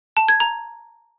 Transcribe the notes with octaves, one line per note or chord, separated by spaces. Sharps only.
A5
G#6
A#5